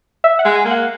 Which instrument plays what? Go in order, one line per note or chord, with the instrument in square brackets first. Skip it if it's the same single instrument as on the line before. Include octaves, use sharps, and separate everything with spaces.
[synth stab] E5
F#5
[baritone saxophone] G#3
[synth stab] G#5
[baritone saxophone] A#3
[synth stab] F#5